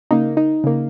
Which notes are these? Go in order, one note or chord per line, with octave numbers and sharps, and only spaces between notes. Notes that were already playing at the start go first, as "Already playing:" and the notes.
C#3 A#3 D#4
D#4
C#3 A#3